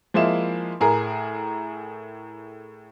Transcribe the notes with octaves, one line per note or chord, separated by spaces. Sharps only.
F3 G#3 A#3 E4 E7
A2 G#4 A#4